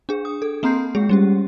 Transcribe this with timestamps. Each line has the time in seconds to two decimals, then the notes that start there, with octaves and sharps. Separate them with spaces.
0.09 D4 G#4
0.25 D#6
0.42 A4
0.63 A#3 C4 A#5 C6 G6 C7
0.95 G#3 G#4
1.09 G3 C#4 G4